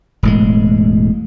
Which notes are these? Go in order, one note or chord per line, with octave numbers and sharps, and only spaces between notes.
E1 A2 G#3